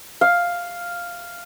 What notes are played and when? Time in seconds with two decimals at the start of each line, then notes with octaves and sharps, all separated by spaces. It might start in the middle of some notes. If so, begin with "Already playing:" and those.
0.21 F5